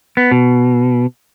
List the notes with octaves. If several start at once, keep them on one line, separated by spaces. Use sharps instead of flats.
B3
B2